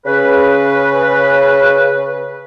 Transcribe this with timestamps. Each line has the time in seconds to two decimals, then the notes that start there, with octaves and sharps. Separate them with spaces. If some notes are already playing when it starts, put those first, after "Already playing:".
0.06 C#3 B4